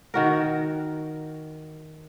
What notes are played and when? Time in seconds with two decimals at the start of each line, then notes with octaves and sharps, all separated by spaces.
0.14 D#3 F#4 A#4